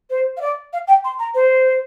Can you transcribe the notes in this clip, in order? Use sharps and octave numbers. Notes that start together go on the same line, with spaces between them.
C5
F5
D5
F5
G5
C6
A#5
C5